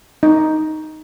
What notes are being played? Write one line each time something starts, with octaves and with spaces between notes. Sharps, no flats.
D#4